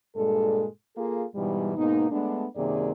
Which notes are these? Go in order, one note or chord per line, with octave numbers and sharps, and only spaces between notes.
G2 A#2 G#3 A4
A#3 F4 G#4 A4
G#2 B2 E3 G3
G#2 B2 A#3 B3 D#4
G#3 A3 B3 D4
F#2 C3 D#3 A#3 G#4 D5